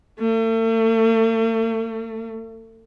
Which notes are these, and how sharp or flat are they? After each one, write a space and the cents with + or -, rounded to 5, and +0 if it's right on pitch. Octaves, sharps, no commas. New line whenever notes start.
A3 +40